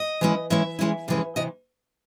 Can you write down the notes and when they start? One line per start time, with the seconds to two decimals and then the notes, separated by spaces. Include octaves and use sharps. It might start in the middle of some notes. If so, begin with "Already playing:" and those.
Already playing: D#5
0.21 E3 G#3 C#4 E4
0.50 E3 G#3 C#4 E4 E5
0.79 E3 G#3 C#4 E4
1.08 F2 C3 E3 G#3 C#4
1.36 C3 E3 D#5